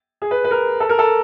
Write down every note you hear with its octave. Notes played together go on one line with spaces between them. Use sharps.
G#4
B4
B4
A#4
A4
A#4
A4